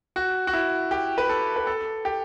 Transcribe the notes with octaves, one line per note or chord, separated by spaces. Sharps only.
F#4
F#4
E4
G4
B4
A4
B4
A4
G4